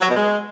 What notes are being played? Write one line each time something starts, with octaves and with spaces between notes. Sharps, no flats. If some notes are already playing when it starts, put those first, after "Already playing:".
F#3
B2
G#3